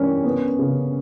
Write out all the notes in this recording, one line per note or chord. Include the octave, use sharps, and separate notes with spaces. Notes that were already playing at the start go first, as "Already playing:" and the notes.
Already playing: E3 G3 C#4 D4 A#4
B3
C#3